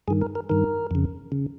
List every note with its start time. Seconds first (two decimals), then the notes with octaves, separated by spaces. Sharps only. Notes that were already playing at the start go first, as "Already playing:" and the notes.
0.08 G2 D#3 G#4
0.21 A#4
0.35 A#4
0.49 G2 D#3 A#4
0.91 F2 C#3
1.32 C#3